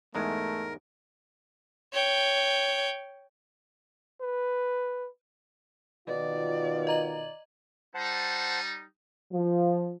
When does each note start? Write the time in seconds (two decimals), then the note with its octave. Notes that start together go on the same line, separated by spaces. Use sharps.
0.15 E2 G#2 G#3 A3 A#4
1.93 C#5 G5
4.22 B4
6.08 B2 D#3 F4 D5
6.87 D#5 A#5 F#7
7.94 G3 D#4 C5 F#5 A5
9.32 F3